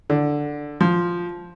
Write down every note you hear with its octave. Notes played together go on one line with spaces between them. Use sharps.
D3
F3